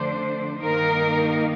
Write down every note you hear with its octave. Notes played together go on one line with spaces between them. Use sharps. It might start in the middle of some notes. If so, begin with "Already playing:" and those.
Already playing: F2 D3 A3 D4 C5
G2 D#3 A#3 D#4 A#4